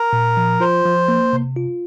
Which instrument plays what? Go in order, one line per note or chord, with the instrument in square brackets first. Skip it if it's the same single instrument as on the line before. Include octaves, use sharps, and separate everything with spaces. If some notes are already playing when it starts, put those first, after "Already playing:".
Already playing: [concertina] A#4
[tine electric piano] A#2
F3
[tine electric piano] F4 [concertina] C5
[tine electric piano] F3
A#3
C3
F4